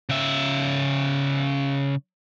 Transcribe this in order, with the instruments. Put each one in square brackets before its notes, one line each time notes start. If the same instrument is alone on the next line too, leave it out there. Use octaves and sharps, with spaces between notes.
[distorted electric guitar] C#3 E5